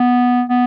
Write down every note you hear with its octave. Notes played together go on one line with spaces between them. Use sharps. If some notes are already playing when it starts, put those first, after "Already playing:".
Already playing: B3
B3